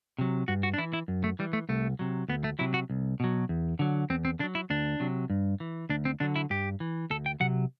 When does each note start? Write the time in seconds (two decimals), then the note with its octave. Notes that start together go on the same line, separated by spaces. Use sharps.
0.18 C3 F#3
0.48 G2 F#4
0.63 F#4
0.74 D4
0.78 E3 E4
0.93 E4
1.08 F#2
1.24 A3
1.39 E3 G3
1.53 A3
1.69 C2 A3
1.99 C3 F#3
2.28 D2 B3
2.44 A3
2.59 C3 F#3 E4
2.74 F#4
2.90 C2
3.20 B2 F#3
3.49 E2
3.79 D3 F#3
4.10 E2 C4
4.25 C4
4.39 D3 D4
4.43 F#3
4.55 E4
4.70 D2 D4
5.00 C3 F#3
5.30 G2
5.60 E3
5.89 D2 D4
6.05 C4
6.20 D3 F#3 D4
6.36 E4
6.50 G2 G4
6.80 E3
7.10 D2 A4
7.26 G5
7.40 C3 F#3 F#5